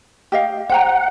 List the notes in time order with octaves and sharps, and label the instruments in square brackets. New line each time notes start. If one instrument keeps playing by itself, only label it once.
[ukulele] G4 D#5 F5
[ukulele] C5 G5 A#5 [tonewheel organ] F#5